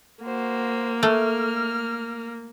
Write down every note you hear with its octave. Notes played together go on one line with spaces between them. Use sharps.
A#3 F#4 C5
A3 F6